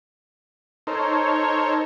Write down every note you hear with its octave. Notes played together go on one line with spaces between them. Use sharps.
D#4 A4 A#4 C5 C#5